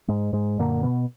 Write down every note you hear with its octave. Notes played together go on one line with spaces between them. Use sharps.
G#2 G#3
G#2 G#3
F#2 A#2 D3 A#3
B2 B3